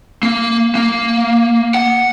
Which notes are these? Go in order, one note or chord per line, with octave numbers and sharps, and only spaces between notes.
A#3
A#3
F#5